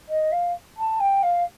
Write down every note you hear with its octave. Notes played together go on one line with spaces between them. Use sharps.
D#5
F5
A5
G5
F5